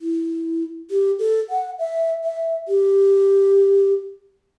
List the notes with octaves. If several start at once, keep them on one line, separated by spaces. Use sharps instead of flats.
E4
G4
A4
F#5
E5
E5
G4